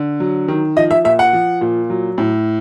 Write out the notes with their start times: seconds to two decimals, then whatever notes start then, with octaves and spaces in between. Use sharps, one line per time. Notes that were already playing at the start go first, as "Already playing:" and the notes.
Already playing: D3
0.20 F#3
0.48 D#3
0.77 F3 D#5
0.91 E5
1.04 A#2 E5
1.19 F#5
1.33 F3
1.61 A#2
1.90 F#3
2.18 A2